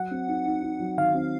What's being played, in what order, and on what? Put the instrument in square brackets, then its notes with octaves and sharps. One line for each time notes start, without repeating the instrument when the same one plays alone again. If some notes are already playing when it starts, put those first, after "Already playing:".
Already playing: [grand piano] F#3 [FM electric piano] F#5
[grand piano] C4
D#4
D#4
D#4
F#3
[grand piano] D#3 [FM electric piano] F5
[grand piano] C4